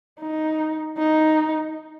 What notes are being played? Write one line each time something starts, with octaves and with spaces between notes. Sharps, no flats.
D#4
D#4